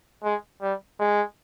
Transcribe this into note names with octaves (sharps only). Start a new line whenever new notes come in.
G#3
G3
G#3